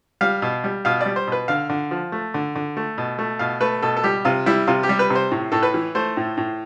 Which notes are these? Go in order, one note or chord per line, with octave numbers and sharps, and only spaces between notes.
G3 F5
B2
G3
B2 F5
G3 D5
C5
B2 B4
D3 F5
D3
F3
A3
D3
D3
A3
B2
A3
B2 F5
A3 B4
B2 A4
A4
G3 G4
C3 F4
G3 E4
C3 F4
G4
G3
B4
C3
C5
A2
A2 A4
B4
E3
A3 C5
A2
A2